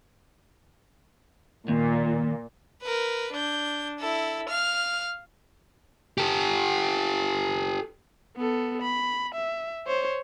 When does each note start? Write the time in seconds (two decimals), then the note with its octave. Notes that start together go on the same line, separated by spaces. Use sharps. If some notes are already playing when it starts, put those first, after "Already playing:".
1.68 D#2 A#2
2.82 A#4 B4
3.32 D4 G6
3.99 E4 A4
4.49 F5 F6
6.18 G4 A4
8.36 B3 A4
8.82 B5
9.35 E5
9.87 C5 C#5